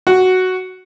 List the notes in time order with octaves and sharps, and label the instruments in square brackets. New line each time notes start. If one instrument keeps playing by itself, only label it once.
[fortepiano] F#4